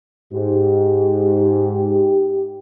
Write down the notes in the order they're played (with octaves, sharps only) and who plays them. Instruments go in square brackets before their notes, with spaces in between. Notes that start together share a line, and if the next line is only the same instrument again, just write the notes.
[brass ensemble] G#2 [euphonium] G4